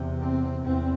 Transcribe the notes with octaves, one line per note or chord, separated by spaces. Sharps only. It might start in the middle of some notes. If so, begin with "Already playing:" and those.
Already playing: E2 C3
C4
E2 C4